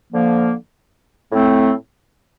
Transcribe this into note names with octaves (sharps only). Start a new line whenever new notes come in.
D3 F3 A#3
A2 A3 C4